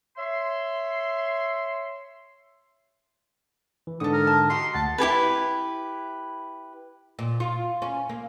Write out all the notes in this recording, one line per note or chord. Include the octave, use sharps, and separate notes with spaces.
C#5 E5 C6
E3
G#2 D3 A4 F#5 D#6
A#4
A5
D#4 F#4 G4 C6
D2 F#5 A5
E4 G4 G#4 B4
A#2
F4
C#4
A#3